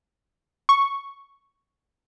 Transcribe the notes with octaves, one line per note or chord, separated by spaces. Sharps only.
C#6